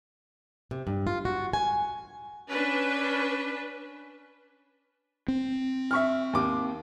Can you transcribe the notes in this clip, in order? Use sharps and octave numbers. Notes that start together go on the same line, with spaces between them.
C3
G2
F4
F#4
G#5
C#4 D4 B4
C4
E5 C#6 F6
D#2 D6